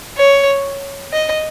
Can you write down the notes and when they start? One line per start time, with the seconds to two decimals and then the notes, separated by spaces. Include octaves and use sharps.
0.17 C#5
1.13 D#5